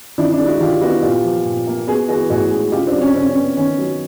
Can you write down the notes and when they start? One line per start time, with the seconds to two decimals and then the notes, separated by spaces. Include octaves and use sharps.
0.18 D#3 D4 E4
0.32 D4 E4
0.39 G#3
0.46 E4 F#4
0.60 D#3 F4 G4
0.81 B3 E4 F#4
1.02 A#2 F4 G4
1.24 F3
1.45 A#2
1.67 A#3
1.87 B3 F#4 G#4
2.08 E3 F#4 G#4
2.30 A2 F#4 G#4
2.51 G#3
2.72 C#3 F4 G4
2.87 C4 D4
2.94 F#3
3.01 C#4
3.15 C#3 C4
3.29 C#4
3.36 B3
3.57 D#3 C#4
3.78 F#3